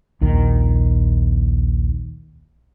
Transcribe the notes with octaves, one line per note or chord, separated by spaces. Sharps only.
A#1 D#2 D#3